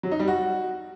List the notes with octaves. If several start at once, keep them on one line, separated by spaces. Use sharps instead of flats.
F#3
D#4
G3
F#4